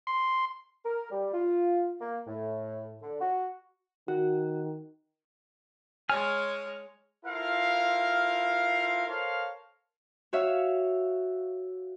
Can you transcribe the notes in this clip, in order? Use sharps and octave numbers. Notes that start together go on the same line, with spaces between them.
C6
A#4
G3
F4
A#3
A2
D3
F#4
D#3 F#4
G#3 C#5 G#5 F6
E4 F4 A4 A#4 C5 F5
A4 A#4 C5 C#5 F5
F#4 C#5 E5 F5